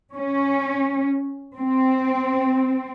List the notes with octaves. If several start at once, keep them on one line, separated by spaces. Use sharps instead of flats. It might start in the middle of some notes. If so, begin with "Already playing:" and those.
C#4
C4